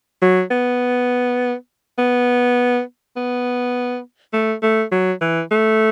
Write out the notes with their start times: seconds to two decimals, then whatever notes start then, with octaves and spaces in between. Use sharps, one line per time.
0.22 F#3
0.51 B3
1.98 B3
3.16 B3
4.33 A3
4.62 A3
4.92 F#3
5.21 E3
5.51 A3